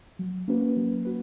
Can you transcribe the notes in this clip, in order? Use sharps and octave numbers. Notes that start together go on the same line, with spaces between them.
F#3
A#3 C#4 F#4 B4
F#3
F#4 B4